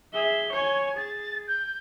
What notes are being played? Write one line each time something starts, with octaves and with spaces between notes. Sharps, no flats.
G#4 E5 G7
C#5 G#5
G#4 A6
G6